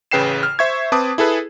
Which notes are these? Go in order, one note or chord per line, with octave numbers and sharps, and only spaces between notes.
A1 C#3 B4 G5 C7 E7
F6
C5 E5 C#6 G#6
C4 B4 A5 D6 D#6
E4 G#4 A4 B4